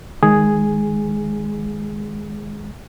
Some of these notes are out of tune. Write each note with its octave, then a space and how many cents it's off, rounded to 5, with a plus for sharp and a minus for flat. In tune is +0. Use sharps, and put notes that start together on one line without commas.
D#3 +0 G#3 +0 G#4 +0